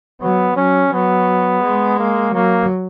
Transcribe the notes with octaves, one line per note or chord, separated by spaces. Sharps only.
F#3 B3
F#3 C#4
F#3 B3
G#3
A#3
F#3 A#3